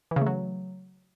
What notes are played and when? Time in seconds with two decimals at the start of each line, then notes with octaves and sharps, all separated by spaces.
0.11 E3
0.16 C#3
0.21 A3
0.26 F#3